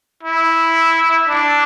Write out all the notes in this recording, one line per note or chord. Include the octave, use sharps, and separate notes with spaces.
E4
D4